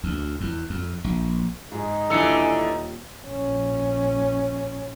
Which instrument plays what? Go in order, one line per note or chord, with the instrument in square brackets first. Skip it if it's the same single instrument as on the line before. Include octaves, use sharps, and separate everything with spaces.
[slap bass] D2
E2
F2
A#1
[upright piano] G#2 G#4 [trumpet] D#4
[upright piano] D#1 D#6 [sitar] D3 E3 [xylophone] E6 C#7
[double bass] A#1 C#4